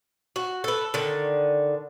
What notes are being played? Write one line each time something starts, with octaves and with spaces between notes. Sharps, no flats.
F#4
A4 B4
D3 D#3